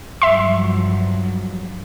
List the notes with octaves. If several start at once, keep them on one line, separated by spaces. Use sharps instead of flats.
G2 F3 F#3 E5 C6